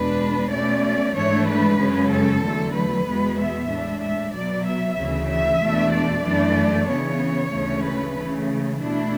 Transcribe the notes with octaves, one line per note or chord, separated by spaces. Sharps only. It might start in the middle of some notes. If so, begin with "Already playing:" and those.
Already playing: E2 B2 G#3 D4 B4
B2 A3 C#4 D5
G#2 E3 A3 D4 C#5
B4
F#2 C#3 G#3 C#4
A4
E2 D3 F#3 A3
B4
E2 B2 G#3 B3
E5
A2 G#3 D4
E5
B2 F#3 B3 D5
E5
D2 C#3 E3
E5
E2 B2 A3 D4
D5
F#2 E3 A3 D4
C#3 E3 B3 C#5
D2 C#3 E3 A3 C#4
B4
C#3 E3 A3 C#4
B2 A3 D4 E4